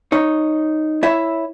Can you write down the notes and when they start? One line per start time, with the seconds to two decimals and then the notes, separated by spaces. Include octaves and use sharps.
0.12 D#4 C#5
1.03 E4 C#5 E5